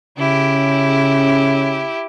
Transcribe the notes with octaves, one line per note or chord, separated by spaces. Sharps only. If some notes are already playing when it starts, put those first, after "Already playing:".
C#3 C#4 E4 G4